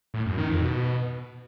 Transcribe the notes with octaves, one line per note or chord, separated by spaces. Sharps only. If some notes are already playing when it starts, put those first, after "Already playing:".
A2
F#2
D#3
F2
B2